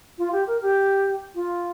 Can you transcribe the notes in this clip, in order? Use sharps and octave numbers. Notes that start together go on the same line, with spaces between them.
F4
G4
A#4
G4
F4